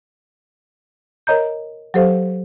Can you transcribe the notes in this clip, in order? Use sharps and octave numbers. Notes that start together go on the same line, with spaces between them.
A#4 C#5 D#5 A#5 G6
F#3 G4 A4 C5 F5